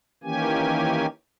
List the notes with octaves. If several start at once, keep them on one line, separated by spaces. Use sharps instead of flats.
D#3 E3 A#3 C#4 G4 G#5